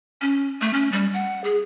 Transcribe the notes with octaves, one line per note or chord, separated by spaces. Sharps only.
C#4
A3
C#4
G3
F#5
G#4